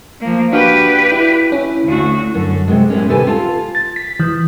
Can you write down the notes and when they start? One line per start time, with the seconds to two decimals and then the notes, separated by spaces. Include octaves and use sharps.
0.21 F3 A#3
0.53 D4 F#4 G4 B4 F5
1.12 E4
1.52 C#4 E4
1.84 D2 F#4
2.34 F#2 D3
2.68 C3 F#3 G#3
2.90 A2 G#3 A#3 C#4
3.08 D#2 C3 G4 A4 B4 G#5
3.27 F4 F5 A5
3.75 A6
3.96 B6
4.20 E3